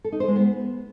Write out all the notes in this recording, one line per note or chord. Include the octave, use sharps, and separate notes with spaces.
A4
D#4
C5
G#3
B3